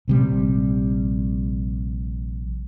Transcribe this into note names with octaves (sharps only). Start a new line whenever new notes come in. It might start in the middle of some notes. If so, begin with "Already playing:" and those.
A#1 C3 G3